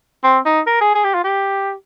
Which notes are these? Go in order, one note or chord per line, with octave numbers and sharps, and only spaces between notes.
C4
D#4
A#4
G#4
G#4
G4
F4
G4